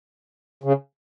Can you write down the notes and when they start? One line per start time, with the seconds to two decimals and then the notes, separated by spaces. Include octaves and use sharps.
0.64 C#3